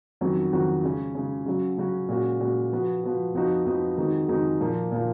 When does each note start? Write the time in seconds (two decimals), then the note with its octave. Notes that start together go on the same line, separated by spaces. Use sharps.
0.21 F2 D#3 F#3 C#4 F#4
0.53 F2 D#3 F#3 C#4 F#4
0.83 C#3 G#3 C#4
1.15 C#3 G#3 C#4
1.46 C#3 F#3 C#4 F#4
1.78 C#3 F#3 C#4 F#4
2.09 A#2 G#3 C#4 F#4
2.40 A#2 G#3 C#4 F#4
2.72 F3 B3 F#4
3.04 F3 B3 F#4
3.34 F2 F3 B3 D#4 F#4
3.66 F2 F3 B3 D#4 F#4
3.98 F2 D#3 G#3 D#4 F#4
4.28 F2 D#3 G#3 D#4 F#4
4.60 A#2 F3 A#3 F4
4.91 A#2 F3 A#3 F4